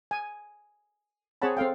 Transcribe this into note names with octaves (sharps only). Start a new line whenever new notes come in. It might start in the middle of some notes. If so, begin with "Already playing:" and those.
G#5
C4 G#4 C#5 F#5 A5 B5
C4 A4 F5 G5